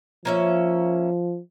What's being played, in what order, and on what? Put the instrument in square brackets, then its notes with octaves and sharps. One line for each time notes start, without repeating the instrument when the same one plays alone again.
[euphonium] F3 [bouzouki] A#3 C#4 E5